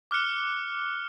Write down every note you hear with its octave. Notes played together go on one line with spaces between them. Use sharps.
D6 F6 F#6 C#7 G7